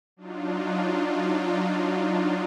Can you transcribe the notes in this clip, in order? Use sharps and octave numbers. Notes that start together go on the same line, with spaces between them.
F#3 D4 D#4 F4